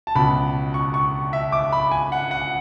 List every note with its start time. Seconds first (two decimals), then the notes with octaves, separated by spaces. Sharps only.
0.07 A5
0.16 C#2 B2 B5
0.74 C#6
0.94 C#6
1.33 E5
1.52 D6
1.72 B5
1.92 G#5
2.12 F#5
2.31 F#5